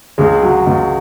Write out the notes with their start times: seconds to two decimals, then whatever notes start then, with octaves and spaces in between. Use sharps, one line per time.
0.18 C#2 G#3
0.43 F#3
0.67 C#2